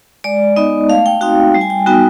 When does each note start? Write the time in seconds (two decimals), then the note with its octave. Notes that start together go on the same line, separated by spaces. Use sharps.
0.24 G#3 D5
0.56 B3 D#4 D#5
0.89 A3 F5
1.06 G5
1.21 C4 D#4 F#4 G5
1.54 G3
1.61 G#5
1.70 G5
1.86 B3 D#4 F#4 G5